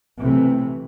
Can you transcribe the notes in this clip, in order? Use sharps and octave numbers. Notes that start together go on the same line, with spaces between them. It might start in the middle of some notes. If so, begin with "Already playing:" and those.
B1 C3 E3 A3